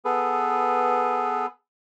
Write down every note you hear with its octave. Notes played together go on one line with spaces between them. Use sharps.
B3 G#4 A4 B4